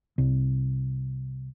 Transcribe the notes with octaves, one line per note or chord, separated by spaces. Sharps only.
C2